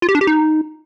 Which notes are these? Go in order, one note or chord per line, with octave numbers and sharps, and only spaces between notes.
F4
G4
D4
G4
D#4